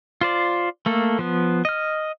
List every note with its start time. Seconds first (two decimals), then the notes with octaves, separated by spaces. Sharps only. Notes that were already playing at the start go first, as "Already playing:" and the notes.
0.21 F4 C5 D5
0.86 A3 A#3 A4
1.19 F3 B3
1.65 D#5 F6